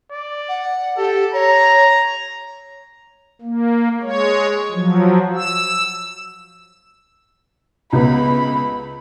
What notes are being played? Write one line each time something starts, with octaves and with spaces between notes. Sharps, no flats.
D5
F#5
G4 A4
C#5 A#5
A#3
G#3 C#5
F3 F#3
E6
C#2 B3 B5